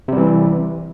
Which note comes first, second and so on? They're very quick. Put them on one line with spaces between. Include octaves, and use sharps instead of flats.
C3 G3 E3